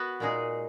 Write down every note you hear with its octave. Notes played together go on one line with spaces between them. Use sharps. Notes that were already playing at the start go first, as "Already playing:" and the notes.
Already playing: B3 F#4
A#2 G#3 D#4 G#4